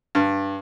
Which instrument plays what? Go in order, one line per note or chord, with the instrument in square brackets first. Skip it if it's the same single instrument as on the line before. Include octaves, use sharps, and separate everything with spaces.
[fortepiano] G2